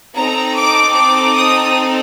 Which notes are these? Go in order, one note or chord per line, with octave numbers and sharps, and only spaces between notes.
C4 D#4 A4 A#5
D6
D6
D#6